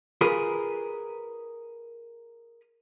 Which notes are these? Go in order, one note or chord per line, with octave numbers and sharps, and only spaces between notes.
F4 G#4 A#4 B4